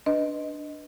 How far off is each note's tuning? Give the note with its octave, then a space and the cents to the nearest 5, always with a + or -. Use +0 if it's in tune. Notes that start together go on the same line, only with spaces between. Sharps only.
D4 +0 B4 +0 D#5 +0